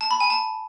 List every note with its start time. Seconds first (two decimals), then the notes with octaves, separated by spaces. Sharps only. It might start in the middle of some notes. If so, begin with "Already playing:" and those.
0.01 A5
0.11 B5
0.20 G#5
0.30 A5